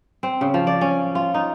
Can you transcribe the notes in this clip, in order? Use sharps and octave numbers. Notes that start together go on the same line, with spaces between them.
C4
C#3
F3
D5
C#4
F4
D#4